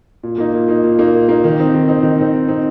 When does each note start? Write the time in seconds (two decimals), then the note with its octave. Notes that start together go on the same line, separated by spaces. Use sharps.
0.23 A#2
0.38 A#3 D#4
0.54 A#2
0.68 A#3 D#4
0.84 A#2
0.99 A#3 D#4
1.13 A#2
1.29 A#3 D#4
1.44 D#3
1.59 C4 D#4
1.74 D#3
1.89 C4 D#4
2.03 D#3
2.19 C4 D#4
2.34 D#3
2.48 C4 D#4